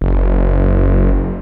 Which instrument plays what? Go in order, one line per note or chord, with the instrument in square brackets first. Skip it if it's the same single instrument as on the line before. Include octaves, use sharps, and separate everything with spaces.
[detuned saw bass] F#1